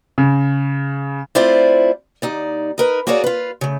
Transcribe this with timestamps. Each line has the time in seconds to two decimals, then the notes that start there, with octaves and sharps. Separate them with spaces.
0.18 C#3
1.35 A3 C4 E4 F4 C5 D5
2.22 D#2 D#4 D5
2.78 D#4 A#4 B4
3.07 A#3 F#4 G#4 A#4 C#5 D5
3.24 F4 B4
3.61 C#3 A3